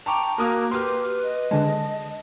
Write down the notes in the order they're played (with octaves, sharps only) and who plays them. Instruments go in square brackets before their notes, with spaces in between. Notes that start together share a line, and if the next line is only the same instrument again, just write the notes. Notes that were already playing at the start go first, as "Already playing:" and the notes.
[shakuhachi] G5 [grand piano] A5 C#6 D6 [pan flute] A#5
[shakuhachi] A#3 [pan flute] F#4 [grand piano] A#4 D#6 F#6
[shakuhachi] G4 [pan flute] B4 [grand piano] C6 F6
[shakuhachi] D#5
[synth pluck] D3 G#3 [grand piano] A5